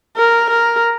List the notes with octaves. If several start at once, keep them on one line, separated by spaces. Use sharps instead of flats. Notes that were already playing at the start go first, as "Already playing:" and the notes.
A#4
A#4